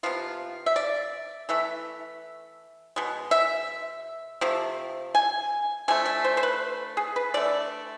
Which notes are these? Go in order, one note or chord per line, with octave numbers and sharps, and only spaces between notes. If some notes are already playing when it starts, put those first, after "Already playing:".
C3 F3 B3 F4
E5
D5
E3 A3 E5
B2 G#3
E5
C3 F3 A3
G#5
D3 F3 A3 G#5
E5
C5
C5
B4
G#4
B4
D3 A3 D5